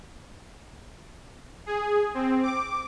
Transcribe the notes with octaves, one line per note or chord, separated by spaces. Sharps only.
G#4
C4
D6